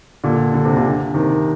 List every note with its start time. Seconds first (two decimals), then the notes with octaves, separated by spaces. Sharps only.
0.24 A#2 D3
0.54 D3
0.65 C3
0.77 A#2 D3
1.14 C3 D#3